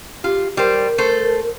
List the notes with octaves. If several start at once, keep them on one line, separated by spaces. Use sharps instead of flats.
F4 G4
G3 A#4 C5
A3 A4 C5